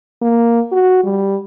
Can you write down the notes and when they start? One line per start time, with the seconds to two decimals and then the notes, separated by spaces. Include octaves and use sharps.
0.22 A#3
0.72 F#4
1.04 G3